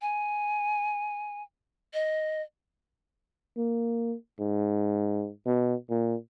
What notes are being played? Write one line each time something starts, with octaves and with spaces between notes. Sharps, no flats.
G#5
D#5
A#3
G#2
B2
A#2